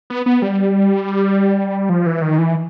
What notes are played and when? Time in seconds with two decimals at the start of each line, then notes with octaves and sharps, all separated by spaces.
0.10 B3
0.26 B3
0.42 G3
1.89 F3
2.06 E3
2.22 D#3
2.38 E3